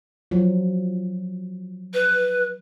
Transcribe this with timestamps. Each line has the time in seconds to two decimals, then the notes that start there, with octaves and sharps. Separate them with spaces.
0.31 F3 F#3
1.94 B4